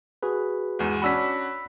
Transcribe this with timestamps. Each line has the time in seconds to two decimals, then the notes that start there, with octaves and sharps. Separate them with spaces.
0.23 F#4 G#4 B4
0.79 E2 G#2
1.02 C#4 D4 F#4 B5 E6 B6